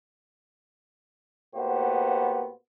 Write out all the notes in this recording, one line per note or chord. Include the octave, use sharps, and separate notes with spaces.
A2 A#3 B3 F#4 G4 C5